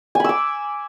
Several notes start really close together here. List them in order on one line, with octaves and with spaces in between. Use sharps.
G#5 B5 E6 D6